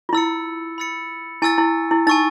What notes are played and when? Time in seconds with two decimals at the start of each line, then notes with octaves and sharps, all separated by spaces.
0.09 F4
0.13 E4 B5 E6 A6 C#7
0.78 B5 E6 A6 C#7
1.42 E4 G#5 C#6 E6 A6
1.58 E4
1.91 E4
2.07 D#4 G#5 C#6 E6 A6